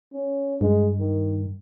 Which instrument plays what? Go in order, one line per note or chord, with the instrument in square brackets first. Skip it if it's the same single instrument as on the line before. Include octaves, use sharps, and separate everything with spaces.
[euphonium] C#4
[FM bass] G2 [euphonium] G#3
[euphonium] D#3